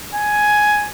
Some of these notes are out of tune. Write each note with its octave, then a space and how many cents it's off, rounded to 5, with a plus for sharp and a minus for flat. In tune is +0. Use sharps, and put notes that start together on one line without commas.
G#5 +10